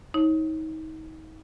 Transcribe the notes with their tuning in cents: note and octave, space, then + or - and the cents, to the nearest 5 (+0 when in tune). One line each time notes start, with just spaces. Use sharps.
D#4 +30 C#5 -20